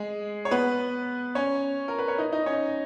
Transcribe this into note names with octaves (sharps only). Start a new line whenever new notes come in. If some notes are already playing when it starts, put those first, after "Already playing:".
Already playing: G#3 G#4
C#5
B3 B4
C#4 C#5
A#4
B4
C#5
D#4 D#5
D#4 D#5
C#4 C#5